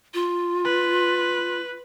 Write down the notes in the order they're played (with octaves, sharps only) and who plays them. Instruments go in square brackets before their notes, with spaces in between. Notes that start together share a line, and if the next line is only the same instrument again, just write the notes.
[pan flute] F4
[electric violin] B4